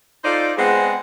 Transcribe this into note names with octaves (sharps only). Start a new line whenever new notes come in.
D#4 F4 A4 C5 D5
G#3 B3 C4 G#4 C5 F#5